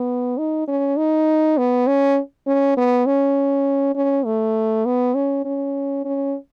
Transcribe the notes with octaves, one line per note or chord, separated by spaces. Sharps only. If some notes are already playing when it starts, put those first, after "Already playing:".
Already playing: B3
D#4
C#4
D#4
B3
C#4
C#4
B3
C#4
C#4
A3
B3
C#4
C#4
C#4